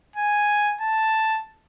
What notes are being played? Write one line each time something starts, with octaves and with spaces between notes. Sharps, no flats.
G#5
A5